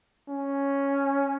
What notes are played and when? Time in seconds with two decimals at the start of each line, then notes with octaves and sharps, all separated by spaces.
0.29 C#4